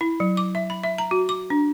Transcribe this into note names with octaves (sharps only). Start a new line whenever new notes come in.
E4
F#3
D6
E5
B5
E5
A#5
F#4
D6
D4